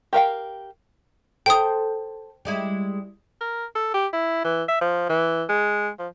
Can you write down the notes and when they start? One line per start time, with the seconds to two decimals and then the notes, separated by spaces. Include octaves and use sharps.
0.13 G4 A#4 F5 G5
1.46 A4 C5 G5 D#6
2.45 G3 G#3 E4
3.41 A#4
3.75 A4
3.94 G4
4.13 E4
4.44 E3
4.68 E5
4.81 F3
5.09 E3
5.49 G#3
5.98 F3